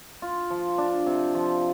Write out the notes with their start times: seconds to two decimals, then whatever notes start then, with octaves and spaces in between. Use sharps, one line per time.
0.22 F4
0.50 F3
0.78 D4
1.06 C3
1.35 F3